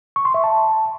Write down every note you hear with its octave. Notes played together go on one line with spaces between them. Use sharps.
C#6
C6
E5
A5